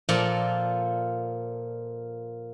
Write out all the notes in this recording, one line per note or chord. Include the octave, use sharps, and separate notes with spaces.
A#2 F3 A#3 A4 D5 A#5